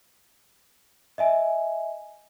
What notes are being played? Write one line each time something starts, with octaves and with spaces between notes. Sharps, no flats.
D#5 E5 G#5